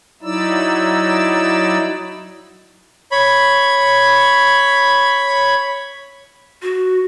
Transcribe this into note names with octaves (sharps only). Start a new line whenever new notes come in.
F#3 D#4 E4 D5 E6
C#5 B5
F#4